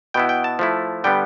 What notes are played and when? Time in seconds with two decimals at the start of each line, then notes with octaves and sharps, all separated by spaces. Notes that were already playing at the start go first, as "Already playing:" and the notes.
0.14 B2 B3 E4 G5
0.29 G5
0.44 A5
0.59 F3 A3 E4
1.04 D3 G3 B3 G5